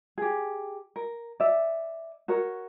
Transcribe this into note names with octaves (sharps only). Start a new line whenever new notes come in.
G4 G#4
A#4
D5 E5
F#4 A#4 C#5